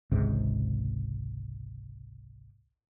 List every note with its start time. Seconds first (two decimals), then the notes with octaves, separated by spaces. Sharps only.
0.12 G#1 C#2 G#2 C3